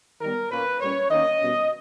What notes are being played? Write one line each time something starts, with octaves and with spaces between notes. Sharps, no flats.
D#3 G3 B3 A#4
A#2 A#3 C#4 B4
A#2 G3 C#4 C#5
D#3 A#3 C#4 D#5
B2 G3 C#4